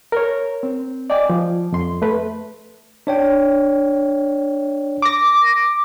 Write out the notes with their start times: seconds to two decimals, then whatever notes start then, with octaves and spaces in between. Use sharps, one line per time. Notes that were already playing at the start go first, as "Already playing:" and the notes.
0.12 A#4 C#5
0.63 C4
1.10 D5 D#5 G5 G#5 D6
1.29 F3
1.72 F2 C6
2.02 A3 B4
3.07 D4 C#5 G5
5.02 D6 A#6